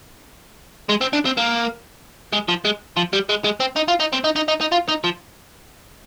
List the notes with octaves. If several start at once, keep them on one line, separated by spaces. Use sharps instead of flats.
G#3
C4
D4
C4
A#3
G#3
F3
G#3
F3
G3
G#3
G#3
C4
D#4
F4
D#4
C4
D#4
D#4
D#4
D#4
F4
D#4
F3